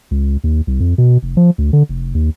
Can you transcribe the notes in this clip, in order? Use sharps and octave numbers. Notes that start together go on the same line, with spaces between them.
C#2
D#2
C2
F2
B2
F1
F3
D2
D3
F1
D#2